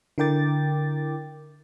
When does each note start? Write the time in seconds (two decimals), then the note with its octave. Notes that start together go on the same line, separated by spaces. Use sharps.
0.18 D3 E4 A#4 G5 D6 A6